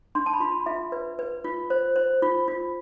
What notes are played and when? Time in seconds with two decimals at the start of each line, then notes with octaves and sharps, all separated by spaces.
0.15 D4 C6
0.26 A5
0.33 B5
0.40 F4 C6
0.66 F4 E5
0.92 B4
1.19 B4
1.44 F4
1.70 C5
1.96 C5
2.22 F4
2.48 F4